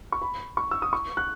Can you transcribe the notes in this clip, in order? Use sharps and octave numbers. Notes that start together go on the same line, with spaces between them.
C#6
B5
C#6
E6
D#6
C#6
F#6